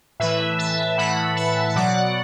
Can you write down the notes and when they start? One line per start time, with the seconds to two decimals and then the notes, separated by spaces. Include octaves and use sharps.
0.20 A2 E3 B4 E5
0.58 E5 A5
0.98 A2 E3 F#5 B5
1.37 E5 A5
1.68 E5
1.76 B2 F#3 D5 F#5